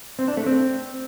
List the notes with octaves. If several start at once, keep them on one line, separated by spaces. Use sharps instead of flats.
C4
D4
A3
C4